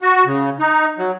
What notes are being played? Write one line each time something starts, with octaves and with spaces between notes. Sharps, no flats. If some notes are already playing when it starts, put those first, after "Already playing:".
F#4
C#3
D#4
F#3